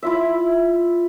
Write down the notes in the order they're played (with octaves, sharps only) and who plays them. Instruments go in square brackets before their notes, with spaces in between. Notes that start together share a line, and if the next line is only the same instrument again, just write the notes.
[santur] E4 F4 E5